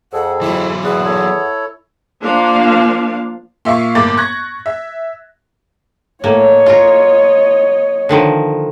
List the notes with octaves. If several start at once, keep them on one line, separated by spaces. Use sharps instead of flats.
F2 G#4 A4 F#5
E3 F#3 E4
E2 G#4 B4 E5 F#5 D#6
E4 A4 C#5
F3 A#3 D4 F5
A#2 E5 F5 C#6
G1 A2 A#3 D6 A6
C#6 F#6 G#6 A#6
E5
A2 A#3 C#5 D#5
F4 A#4
D3 D#3 F3